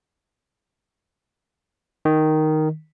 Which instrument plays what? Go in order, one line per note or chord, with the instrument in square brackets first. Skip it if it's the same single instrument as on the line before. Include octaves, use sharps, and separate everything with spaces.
[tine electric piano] D#3